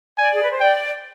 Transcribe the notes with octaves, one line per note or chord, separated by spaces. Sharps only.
D5 G#5
G#4
B4
C5
D5 G5